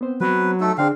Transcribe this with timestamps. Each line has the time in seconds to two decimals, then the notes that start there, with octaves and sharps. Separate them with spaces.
0.01 B3 C4 C5
0.21 F#3 B4
0.60 A3 D#4 A4
0.78 D3 C4 D4 G#4 F5